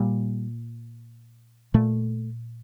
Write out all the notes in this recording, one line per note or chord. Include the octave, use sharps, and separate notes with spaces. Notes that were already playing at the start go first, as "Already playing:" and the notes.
Already playing: A#2 G3
A#2 A3